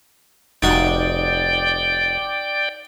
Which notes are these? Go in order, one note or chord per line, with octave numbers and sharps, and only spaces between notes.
F1 D#4 F#4 D5 G5